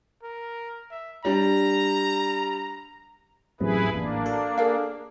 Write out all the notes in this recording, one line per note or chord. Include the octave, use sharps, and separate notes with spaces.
A#4
E5
G3 D4 A#5
A1 F#2 C3 E4 G#4 B4
A1 A#3 D4
F#4 A4
G#4 A#4 F5